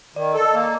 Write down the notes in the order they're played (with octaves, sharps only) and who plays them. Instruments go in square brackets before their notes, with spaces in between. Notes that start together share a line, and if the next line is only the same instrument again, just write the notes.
[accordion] D#3 [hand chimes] D5
[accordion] A4
[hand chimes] D#5
[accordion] A#3